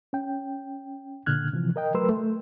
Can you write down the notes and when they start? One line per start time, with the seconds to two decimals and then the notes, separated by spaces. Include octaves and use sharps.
0.13 C#4 G5
1.26 A#2 D3 F6 F#6 G#6
1.53 C3 E3 F3
1.76 A#4 D#5 G5
1.94 F#3 A3 A#4 B4 C6 E6
2.09 A3